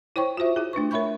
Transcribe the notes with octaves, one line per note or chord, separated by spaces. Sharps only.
E4 C5 C#5 G5 C#6
F4 F#4 C5 E5
E4 G#4
A3 D4 B4 C#6
A#4 C#5 E5 B5 C#6 G6